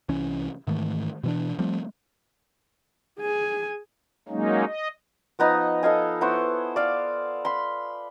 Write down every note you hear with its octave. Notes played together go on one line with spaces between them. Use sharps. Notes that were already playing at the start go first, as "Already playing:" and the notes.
C2 E3 C#4
G#2 D#3 E3 A3
B2 E3 D4
F3 G3 A3 C4
G#4 G#5
F#3 G#3 A#3 C#4 D#4
D#5
F3 B3 D#4 D#5
A4 D#5 F5 G#5
B3 E4 C5 C#5
D5 F5
B5 C6